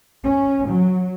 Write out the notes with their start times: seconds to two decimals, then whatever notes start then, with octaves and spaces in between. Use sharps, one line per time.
0.25 C#4
0.69 F#3